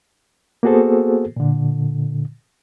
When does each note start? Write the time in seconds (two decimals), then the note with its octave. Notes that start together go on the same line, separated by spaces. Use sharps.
0.63 A#3 B3 F#4 G#4 A4 C5
1.36 A#2 D3